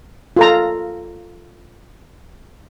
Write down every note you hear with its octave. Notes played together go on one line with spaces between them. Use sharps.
F4 A4 A#5